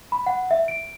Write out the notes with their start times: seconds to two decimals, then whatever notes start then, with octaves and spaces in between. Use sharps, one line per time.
0.12 B5
0.26 F#5
0.51 E5
0.68 D7